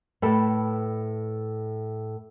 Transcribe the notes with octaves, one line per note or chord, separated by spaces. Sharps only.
A2 A4 B4 G5 A5